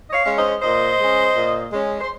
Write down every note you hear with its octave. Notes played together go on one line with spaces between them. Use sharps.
D#5
C#5 F5
G#3 C#4
C5 D#5
A#2 C5 D#5
G#3 C#4
A#2
G#3 C#4
C5